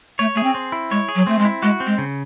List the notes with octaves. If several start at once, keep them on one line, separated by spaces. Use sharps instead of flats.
A3 C#5
A3 G#4
C4
C4
E4
G#3 C#5
G#4
F#3
A3 C4
G#3
E4
G#3 F#4
C4
G#3
C#3